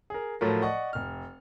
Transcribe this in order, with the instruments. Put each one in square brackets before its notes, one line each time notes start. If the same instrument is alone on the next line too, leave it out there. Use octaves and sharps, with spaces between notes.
[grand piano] G#4 A#4
A2 F3 F#3 A3 F4 A#4
D5 D#5 F#5 C#6
F1 F6